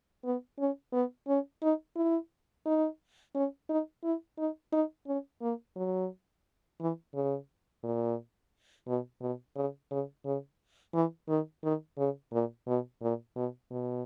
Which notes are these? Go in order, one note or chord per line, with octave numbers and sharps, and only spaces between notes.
B3
C#4
B3
C#4
D#4
E4
D#4
C#4
D#4
E4
D#4
D#4
C#4
A#3
F#3
E3
C#3
A#2
B2
B2
C#3
C#3
C#3
E3
D#3
D#3
C#3
A#2
B2
A#2
B2
B2